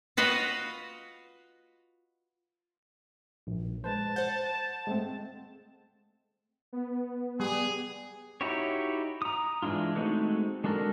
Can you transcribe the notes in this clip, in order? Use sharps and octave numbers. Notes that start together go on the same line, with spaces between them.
F4 F#4 B4 D#5 F5
A#1
G#3 B4 C5 A5
C5 F#5 G6
G#3 A3 C4
B3
G3 G#4
D#4 E4 F#4 G4 C#5
A#5 D#6
E3 G#3 D4 E4 F4
G#3 A3 C4 D#4 F#4
G#3 D4 F#4 A4 A#4